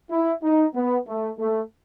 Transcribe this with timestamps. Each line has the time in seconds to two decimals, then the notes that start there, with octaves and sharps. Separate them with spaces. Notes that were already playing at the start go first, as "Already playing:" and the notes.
0.11 E4
0.43 D#4
0.75 B3
1.07 A3
1.39 A3